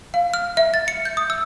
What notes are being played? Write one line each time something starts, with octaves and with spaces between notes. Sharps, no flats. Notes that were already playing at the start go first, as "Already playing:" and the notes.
F5
F6
E5
A6
C#7
G6
D#6
E6